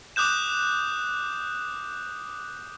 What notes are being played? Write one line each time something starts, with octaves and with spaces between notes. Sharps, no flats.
D6 D#6 F#6 G6 E7